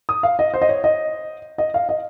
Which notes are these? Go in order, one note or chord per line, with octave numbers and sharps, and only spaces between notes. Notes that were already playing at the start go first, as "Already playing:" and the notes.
D#6
F5
D#5
C5
D#5
C#5
D#5
D#5
F5
D#5